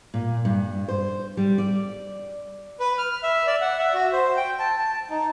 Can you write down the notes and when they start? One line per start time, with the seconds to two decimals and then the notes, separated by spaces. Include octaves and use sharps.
0.14 A#2
0.45 G2
0.88 C5
1.37 G3
1.58 D5
2.80 B4
2.98 F6
3.23 E5
3.47 D5
3.61 F#5
3.79 E5
3.94 F#4
4.13 C5
4.37 G5
4.59 A5
4.78 A5
5.10 D#4